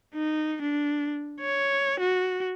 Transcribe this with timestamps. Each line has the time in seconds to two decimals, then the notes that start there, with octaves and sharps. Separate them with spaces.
0.14 D#4
0.62 D4
1.40 C#5
2.00 F#4